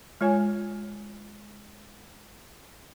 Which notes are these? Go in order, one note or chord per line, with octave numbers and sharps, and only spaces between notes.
G#3 F4 C#5 G#5